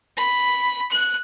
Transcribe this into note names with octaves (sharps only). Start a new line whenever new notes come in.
B5
F#6